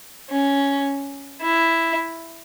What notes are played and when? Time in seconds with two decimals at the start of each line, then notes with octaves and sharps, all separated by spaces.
0.30 C#4
1.42 E4